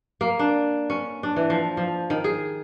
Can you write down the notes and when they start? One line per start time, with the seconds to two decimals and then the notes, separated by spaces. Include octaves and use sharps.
0.21 A#3
0.39 D4
0.90 C#4
1.23 D4
1.36 E3
1.50 F3
1.77 F3
2.10 D#3
2.24 G#4